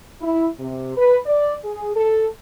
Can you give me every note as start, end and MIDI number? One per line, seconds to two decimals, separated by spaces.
0.21 0.47 64
0.59 0.94 48
0.96 1.17 71
1.26 1.54 74
1.64 1.93 68
1.95 2.27 69